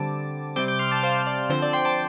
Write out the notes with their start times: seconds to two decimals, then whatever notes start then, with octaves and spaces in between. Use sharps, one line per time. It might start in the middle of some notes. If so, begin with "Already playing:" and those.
Already playing: D3 G3 C4 A5 D6
0.56 C3 G3 C4 D6 G6
0.68 D6 G6
0.79 C6 F6
0.91 A5 D6
1.03 C5 F5
1.27 D5
1.50 D3 F3 C4 C5
1.62 D5
1.73 G5 C6
1.85 A5 D6